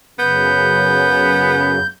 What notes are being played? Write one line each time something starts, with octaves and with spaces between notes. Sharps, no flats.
F#2 C#3 B3 G6